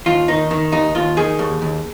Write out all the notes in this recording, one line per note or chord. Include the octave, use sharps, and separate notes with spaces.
D#2 F4
D#3 D#4
D#3
D#2 D#4
D#2 F4
D#3 G#4
D#2
D#2